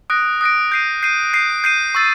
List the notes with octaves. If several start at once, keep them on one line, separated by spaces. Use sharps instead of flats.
D#6 F#6 A#6 D7
D#6 F#6 A#6 D7
G6 C7 D#7
G6 C7 D#7
G6 C7 D#7
G6 C7 D#7
C#6 E6 A6